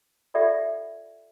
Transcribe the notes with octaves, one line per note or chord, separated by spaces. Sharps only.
F4 G4 A4 D5 E5 F#5